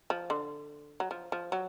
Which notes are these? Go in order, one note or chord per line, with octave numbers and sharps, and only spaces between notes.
F3
D3
F#3
F3
F3
F#3